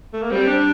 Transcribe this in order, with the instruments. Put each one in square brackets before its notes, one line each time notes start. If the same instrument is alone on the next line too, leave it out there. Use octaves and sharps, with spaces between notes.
[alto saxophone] A3
A#3
[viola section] G3 [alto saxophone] C4
[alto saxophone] D4